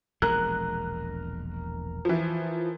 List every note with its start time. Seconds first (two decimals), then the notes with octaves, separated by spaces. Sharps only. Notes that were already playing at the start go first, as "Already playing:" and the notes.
0.22 E1 A#1 G#3 A#4 F#6
2.05 E3 F3